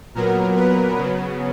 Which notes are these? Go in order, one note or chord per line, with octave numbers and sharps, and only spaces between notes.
A#2 F#3 B3 A#4
B4
C#3 F#3 B3